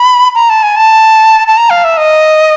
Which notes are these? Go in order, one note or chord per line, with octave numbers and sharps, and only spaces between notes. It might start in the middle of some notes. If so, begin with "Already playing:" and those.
Already playing: B5
A#5
A5
G#5
A5
A5
A#5
F5
E5
D#5